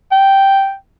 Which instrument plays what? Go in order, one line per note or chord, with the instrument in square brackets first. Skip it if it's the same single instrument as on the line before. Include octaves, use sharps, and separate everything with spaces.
[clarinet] G5